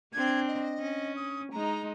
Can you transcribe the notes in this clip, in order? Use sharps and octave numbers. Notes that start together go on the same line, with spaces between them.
C4 D4 G#6
D#5
C#4
D#6
G#3 D#4 A#5